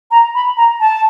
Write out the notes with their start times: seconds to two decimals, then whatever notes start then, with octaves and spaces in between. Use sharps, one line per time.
0.11 A#5
0.34 B5
0.57 A#5
0.80 A5